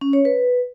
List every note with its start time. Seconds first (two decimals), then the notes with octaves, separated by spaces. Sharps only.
0.01 C#4
0.13 C#5
0.25 B4